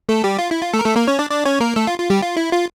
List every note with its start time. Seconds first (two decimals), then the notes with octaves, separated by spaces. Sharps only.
0.09 A3 A4
0.24 G3 G4
0.39 F4
0.51 E4
0.62 F4
0.74 A3 A4
0.79 A#4
0.84 A3 A4
0.96 A#3 A#4
1.07 C#4 C#5
1.19 D4 D5
1.30 D4 D5
1.45 C#4 C#5
1.60 A#3 A#4
1.76 A3 A4
1.87 F4
1.99 F4
2.10 G3 G4
2.22 F4
2.37 E4
2.52 F4